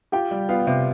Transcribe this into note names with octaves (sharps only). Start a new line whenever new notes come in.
F4 G4 G5
G3
B3 F4 F5
C3